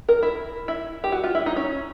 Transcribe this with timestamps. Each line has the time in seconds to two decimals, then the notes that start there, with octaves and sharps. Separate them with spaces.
0.09 A#4
0.23 E4
0.68 E4
1.04 G4
1.12 F#4
1.24 F4
1.35 E4
1.46 D#4
1.56 C#4